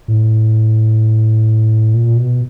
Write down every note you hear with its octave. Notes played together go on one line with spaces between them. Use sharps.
A2
A#2
B2